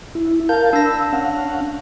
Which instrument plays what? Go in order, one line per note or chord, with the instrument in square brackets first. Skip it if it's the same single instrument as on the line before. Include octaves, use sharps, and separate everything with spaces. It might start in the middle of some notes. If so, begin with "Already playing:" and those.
[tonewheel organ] E4
[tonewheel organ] A#4 F5 A5 [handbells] G6
[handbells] D4 A#6 [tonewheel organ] B5 E6
[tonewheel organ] C#4 F5 F#5